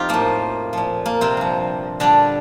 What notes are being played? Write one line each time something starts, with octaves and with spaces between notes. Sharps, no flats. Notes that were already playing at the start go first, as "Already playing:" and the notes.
Already playing: F2 D#4 F4 G4
A2 F3 A#3
A#2 F3
A#3
C3 C4
G2 F3
A#2 D3 G3 D4